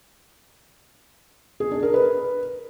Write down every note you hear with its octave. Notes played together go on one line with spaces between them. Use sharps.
G#4
D4
A#4
B4